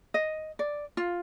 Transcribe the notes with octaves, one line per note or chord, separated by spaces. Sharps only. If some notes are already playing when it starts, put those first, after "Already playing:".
D#5
D5
F4